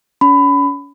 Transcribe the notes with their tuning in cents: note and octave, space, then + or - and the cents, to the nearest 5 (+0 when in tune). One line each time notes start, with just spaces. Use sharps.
C#4 +35 B5 +20